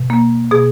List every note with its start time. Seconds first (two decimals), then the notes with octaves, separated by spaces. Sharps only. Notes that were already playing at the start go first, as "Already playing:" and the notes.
Already playing: B2
0.10 A#3
0.51 B2 G#4